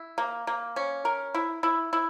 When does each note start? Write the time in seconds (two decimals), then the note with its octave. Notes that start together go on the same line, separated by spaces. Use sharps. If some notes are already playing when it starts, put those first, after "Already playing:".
Already playing: E4
0.18 A#3
0.47 A#3
0.76 C#4
1.05 A#4
1.34 E4
1.63 E4
1.93 E4